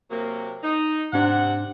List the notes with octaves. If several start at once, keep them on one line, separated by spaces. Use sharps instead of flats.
C3 F#3 A#3
D#4
G#2 C3 D4 F#5